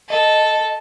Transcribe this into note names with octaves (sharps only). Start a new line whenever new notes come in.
A4 D#5